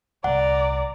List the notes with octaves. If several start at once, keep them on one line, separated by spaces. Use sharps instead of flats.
C2 A#2 D5 F#5 A#5